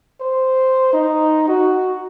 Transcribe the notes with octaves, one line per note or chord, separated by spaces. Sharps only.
C5
D#4
F#4